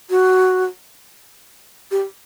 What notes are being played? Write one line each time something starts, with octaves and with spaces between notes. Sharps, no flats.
F#4
G4